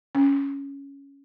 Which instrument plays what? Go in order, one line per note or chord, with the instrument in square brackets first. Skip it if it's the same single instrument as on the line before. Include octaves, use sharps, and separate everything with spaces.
[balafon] C#4